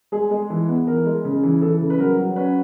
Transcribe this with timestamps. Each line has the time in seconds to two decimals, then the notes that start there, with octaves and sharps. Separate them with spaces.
0.12 G#3 G#4
0.31 G#3
0.50 E3
0.68 B3
0.87 E3 A#4
1.06 G#3
1.25 C#3
1.43 E3
1.62 E3 A4
1.81 C#3
1.90 B4
1.99 F#3 A#4
2.18 F#3
2.36 C#4 B4